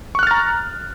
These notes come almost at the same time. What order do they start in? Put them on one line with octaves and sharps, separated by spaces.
C#6 F#6 F6 A6 A#5